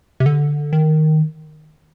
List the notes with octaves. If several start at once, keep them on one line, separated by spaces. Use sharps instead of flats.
C3
D3
D#3